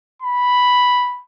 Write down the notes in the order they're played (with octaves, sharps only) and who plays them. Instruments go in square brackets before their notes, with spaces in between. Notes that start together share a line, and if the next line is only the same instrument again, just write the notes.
[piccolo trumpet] B5